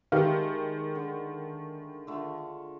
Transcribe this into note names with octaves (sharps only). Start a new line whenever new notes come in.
D#3 G#3 A3 G4 F5
D3
D3 A3 F4